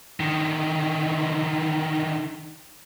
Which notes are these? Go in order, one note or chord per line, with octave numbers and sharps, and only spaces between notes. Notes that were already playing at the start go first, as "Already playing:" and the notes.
D3 D#3